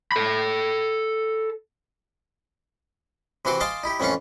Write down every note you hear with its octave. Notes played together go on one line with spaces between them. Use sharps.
A4 B5
C3 E3 C4 F#4 C6 D6
D#5 F5 G#5 A5 C6 D6
D#4 E4 G4
F2 E3 A3 C#4 F5 C#6